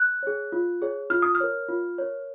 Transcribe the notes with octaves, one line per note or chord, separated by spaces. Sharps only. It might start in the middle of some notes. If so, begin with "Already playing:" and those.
Already playing: F#6
G#4 C#5
F4
G#4 C#5
F4 F6
D#6
F6
A#4 C#5
F4
A#4 C#5